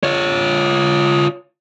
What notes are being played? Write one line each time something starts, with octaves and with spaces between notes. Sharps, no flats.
F4 C#5